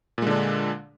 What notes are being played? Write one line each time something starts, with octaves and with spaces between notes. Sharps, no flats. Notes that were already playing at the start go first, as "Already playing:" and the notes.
A#2 D3 G#3 D4